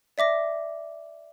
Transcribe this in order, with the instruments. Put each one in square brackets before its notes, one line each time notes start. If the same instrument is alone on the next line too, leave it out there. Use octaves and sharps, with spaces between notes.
[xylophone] D5 E5 D6 A#6